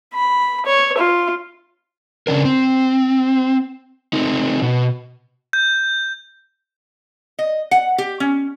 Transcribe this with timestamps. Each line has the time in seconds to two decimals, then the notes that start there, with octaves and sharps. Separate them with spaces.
0.14 B5
0.66 C#5
0.98 F4
2.27 C#3 C#4 D4 A#4
2.45 C4
4.13 A3 C4 D#4
4.62 B2
5.53 G6
7.39 D#5
7.71 F#5
7.98 G4
8.20 C#4